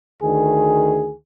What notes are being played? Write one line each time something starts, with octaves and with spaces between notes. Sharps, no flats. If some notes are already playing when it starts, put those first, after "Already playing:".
D2 D#3 G#4